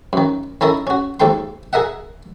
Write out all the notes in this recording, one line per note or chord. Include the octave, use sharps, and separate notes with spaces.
F#2 D#3
D#3 C#4 E4 A4 A#4 D#5
C#4 F#4
D#2 G#2 A4 G5 C6
G#4 A#4 D#5 E5 F#5